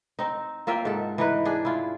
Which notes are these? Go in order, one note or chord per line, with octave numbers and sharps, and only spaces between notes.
C4 D#4
A#3 F4 E5 G5
G#2 A4
E3 D#4 B4
D4 G#4
E4 F4